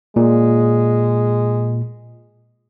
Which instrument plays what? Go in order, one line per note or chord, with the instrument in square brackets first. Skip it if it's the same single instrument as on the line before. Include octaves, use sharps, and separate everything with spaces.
[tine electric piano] A#2 [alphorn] G#3